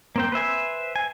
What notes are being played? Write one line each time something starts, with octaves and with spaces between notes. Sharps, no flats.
A#3 C4 G5
B4 C5 E5 G#5
G#5